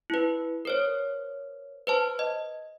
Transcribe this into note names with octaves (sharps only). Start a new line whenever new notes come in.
E4 B4
A#4 C5 C#5
B4 C5 A5
D#5